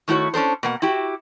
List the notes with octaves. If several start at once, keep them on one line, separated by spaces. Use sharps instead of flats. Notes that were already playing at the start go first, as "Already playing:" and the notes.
D#3 A3 E4 F#4 C#5
C#4 D4 A4 C5
B2 A#3 F#5
E4 F#4 G4